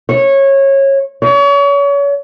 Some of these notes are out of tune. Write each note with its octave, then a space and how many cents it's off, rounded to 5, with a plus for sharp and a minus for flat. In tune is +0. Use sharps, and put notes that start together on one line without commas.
C#5 -20
C#5 +35